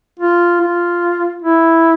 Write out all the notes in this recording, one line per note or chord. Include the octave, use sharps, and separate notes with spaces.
F4
F4
E4